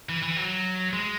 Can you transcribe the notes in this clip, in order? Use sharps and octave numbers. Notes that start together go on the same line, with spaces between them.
E3
E3
F#3
G#3